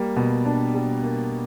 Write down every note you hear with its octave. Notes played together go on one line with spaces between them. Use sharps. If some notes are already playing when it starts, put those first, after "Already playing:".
Already playing: G3 A#3
B2
D4
G3
A#3